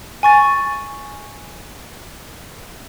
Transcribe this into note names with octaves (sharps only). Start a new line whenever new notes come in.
G#5 C#6 A6